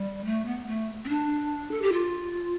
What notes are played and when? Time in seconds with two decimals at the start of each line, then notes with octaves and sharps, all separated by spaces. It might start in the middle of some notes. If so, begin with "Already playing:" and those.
Already playing: G3
0.25 A3
0.46 B3
0.67 A3
1.05 C4
1.09 D4
1.71 A4
1.82 G4
1.93 F4